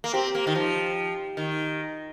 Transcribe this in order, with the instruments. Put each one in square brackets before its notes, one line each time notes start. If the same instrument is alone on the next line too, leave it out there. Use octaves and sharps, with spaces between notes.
[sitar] A#3
[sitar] C4 [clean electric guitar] G4
[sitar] A#3
D#3
F3
D#3